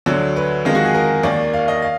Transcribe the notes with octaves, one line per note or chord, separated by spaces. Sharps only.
D2 D3 F#3
B4
F2 D#3 G#3 F4
F#4
G#4
A#4
D#2 D#3 A#3 D5
F5
D#5
F5